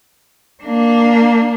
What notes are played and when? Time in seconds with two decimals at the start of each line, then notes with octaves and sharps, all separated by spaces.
0.63 A#3 D4